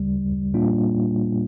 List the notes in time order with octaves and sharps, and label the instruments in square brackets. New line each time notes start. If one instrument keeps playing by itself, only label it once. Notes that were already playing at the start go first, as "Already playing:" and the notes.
Already playing: [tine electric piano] D2 C#3 G3
A#2 G3 A#3 D4 F4